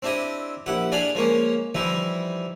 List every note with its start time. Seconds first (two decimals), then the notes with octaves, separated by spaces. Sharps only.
0.02 C4 D4 E4 G4 D#5
0.66 A#1 E4 G4 F#5
0.92 D4 G#4 D5 F5 B5
1.15 F3 G#3 A#3 C#4
1.75 E3 F3 G3 D#4 E4